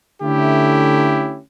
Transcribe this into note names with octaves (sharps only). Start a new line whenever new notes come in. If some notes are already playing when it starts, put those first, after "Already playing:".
D3 A3 C#4 E4 G4